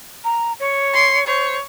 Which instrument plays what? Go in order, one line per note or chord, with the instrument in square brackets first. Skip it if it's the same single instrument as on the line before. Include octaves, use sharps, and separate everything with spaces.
[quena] A#5
C#5
[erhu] C6
[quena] C5 [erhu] C#5